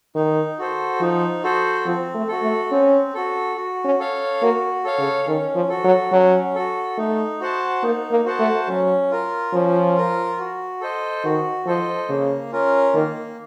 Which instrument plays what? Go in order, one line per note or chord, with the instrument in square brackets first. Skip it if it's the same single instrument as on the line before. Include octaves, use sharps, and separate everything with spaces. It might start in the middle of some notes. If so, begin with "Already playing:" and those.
[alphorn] D#3 [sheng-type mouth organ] D#4
[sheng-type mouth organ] F#4 A4 C5
[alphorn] F3 [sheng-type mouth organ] D#4
[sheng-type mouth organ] F#4 A4 C5
[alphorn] F3 [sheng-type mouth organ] C4
[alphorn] A3
[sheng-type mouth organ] F#4 A4
[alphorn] A3
[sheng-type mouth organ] C4 [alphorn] C#4
[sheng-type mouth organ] F#4 A4
F#4
[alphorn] C#4
[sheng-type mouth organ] A4 C#5 F5
[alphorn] A#3 [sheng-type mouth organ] F#4
[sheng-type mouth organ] A4 C#5 F5
[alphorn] C#3
[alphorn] D#3 [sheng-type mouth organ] C#4
[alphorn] F3
[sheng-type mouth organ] F#4 A4
[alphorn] F#3
[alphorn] F#3 [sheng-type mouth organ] C#4
[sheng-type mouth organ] F#4 A4
[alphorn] A3 [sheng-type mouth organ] D#4
[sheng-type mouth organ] F#4 C5 F#5 A5
[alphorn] A#3 [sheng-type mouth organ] D#4
[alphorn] A#3
[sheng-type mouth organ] F#4 C5 F#5 A5
[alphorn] A3
[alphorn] F#3 [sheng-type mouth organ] C#4
[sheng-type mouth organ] F4 A#4
[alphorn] F3 [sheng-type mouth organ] C#4
[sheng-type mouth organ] F4 A#4
F#4
A4 C5 D#5
[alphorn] D#3 [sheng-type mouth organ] F#4
[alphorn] F3 [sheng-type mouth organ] A4 C5 D#5
[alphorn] C#3 [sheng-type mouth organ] A#3
[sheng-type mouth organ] C#4 F4 A#4
[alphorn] D#3 [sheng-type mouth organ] A#3